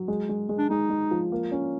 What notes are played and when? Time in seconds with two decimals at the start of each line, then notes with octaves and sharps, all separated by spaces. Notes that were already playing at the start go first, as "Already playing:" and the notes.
Already playing: F#3
0.08 G#3
0.29 G#3
0.49 G#3
0.58 D4
0.70 G#3 D#4
0.90 G#3
1.11 F3
1.32 A#3
1.52 C#4